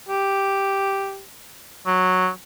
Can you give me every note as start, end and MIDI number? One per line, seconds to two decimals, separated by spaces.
0.09 1.21 67
1.86 2.29 54